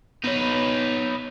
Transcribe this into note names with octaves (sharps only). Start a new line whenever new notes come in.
B3 D#4 B4 C#5